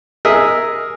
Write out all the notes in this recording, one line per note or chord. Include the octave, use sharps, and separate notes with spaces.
G#4 A#4 D#5 E5